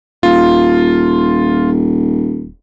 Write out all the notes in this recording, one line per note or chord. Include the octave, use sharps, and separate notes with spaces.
D#1 F4